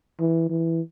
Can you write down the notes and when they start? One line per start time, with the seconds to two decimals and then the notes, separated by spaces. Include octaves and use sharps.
0.20 E3
0.50 E3